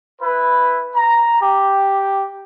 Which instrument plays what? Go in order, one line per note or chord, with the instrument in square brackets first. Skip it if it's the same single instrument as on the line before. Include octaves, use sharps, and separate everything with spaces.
[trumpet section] E4 B4
A#5
G4